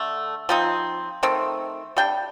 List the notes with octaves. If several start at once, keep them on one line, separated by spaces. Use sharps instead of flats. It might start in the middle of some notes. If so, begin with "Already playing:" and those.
Already playing: D3 A3
F3 C4 D#4
D#3 A3 C4
G3 D4 G5